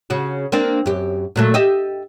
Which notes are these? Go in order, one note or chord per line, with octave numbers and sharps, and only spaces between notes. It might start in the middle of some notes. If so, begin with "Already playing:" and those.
C#3 F#4
A#3 C4 D4
F#2 G4
A#2 F#3 A3
G4 D#5 E5